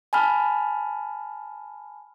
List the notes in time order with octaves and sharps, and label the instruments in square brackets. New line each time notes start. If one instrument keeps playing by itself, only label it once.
[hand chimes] G#5 A5 B5 F6